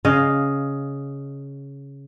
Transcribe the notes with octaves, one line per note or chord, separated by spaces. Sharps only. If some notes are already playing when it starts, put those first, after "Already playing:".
C#3 D#5 F5